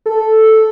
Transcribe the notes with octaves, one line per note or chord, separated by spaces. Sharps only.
A4